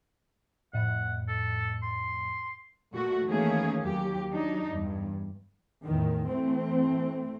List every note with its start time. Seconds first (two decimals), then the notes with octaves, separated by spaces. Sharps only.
0.73 F2 A2 F#5
1.28 A4
1.82 C6
2.93 A#2 A3 F#4
3.26 D#3 E3 A3 A#3 C#4 G#4
3.82 D#2 F#3 G4
4.31 F#3 D4 D#4
4.68 E2 G2
5.85 E2 A2 D#3
6.27 E3 A3 C4